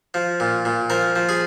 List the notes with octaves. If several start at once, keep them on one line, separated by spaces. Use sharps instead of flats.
F3
A#2
A#2
F3 A#4
F3
G#4